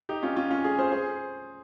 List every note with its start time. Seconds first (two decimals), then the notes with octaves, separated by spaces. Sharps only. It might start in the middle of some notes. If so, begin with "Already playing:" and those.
0.09 D#4 G4
0.23 C#4 F4
0.36 C#4 F4
0.50 C#4 F4
0.64 F4 G#4
0.79 G#4 C5
0.92 G#4 C5